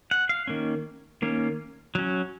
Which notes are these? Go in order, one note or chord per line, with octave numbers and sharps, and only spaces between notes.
F#5
F5
D#3 A#3 C#4
D#3 A#3 C#4
F#3 C#4